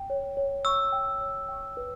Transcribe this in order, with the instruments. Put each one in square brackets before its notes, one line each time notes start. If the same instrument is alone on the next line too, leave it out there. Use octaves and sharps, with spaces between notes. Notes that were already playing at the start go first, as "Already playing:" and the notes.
Already playing: [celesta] G5
C#5
C#5
[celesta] C#6 [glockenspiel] E6
[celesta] G5
C#5
G5
B4